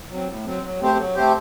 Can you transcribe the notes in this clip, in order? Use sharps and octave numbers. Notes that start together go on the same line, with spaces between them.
F#3 C4
A2
F#3 C4
F#3
A3 C4 G4 C5
F#3
A3 C4 G4 C5